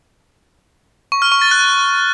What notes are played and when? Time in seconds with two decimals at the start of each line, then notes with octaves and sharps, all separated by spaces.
1.12 C#6
1.22 F6
1.32 C#6
1.42 A6
1.51 F#6